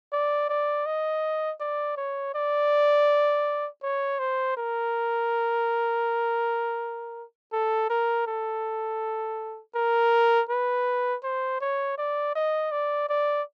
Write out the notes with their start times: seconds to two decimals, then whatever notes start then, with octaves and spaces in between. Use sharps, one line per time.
0.12 D5
0.50 D5
0.86 D#5
1.61 D5
1.97 C#5
2.35 D5
3.83 C#5
4.19 C5
4.57 A#4
7.53 A4
7.90 A#4
8.27 A4
9.75 A#4
10.49 B4
11.24 C5
11.61 C#5
11.98 D5
12.36 D#5
12.72 D5
13.09 D5